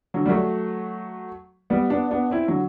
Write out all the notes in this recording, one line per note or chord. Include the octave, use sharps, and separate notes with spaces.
D3 F#3
G3
F#3 A3
G3 B3
B3 D4
B3 D4
C4 E4
D3 F#3